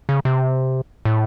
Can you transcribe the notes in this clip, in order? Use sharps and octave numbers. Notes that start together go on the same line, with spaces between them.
C#3
C3
A2